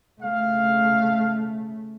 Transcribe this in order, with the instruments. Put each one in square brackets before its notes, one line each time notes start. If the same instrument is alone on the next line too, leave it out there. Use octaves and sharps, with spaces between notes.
[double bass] C#3 A3 [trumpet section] F5